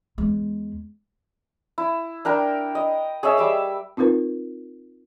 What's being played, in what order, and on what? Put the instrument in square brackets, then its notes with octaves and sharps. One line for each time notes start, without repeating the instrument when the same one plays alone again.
[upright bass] E2 G#3
[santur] E4
D4 A#4 G5 B5
D#5
G#4 C#5 D#5 E5
G3 E5 D6
[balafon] C4 D#4 F4 A#4 B4